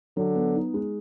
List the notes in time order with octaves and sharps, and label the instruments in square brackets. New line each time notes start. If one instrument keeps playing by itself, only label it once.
[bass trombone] D3 [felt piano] F#3
[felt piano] B3
D#4
G#3